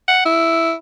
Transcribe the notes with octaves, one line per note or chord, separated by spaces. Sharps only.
F#5
E4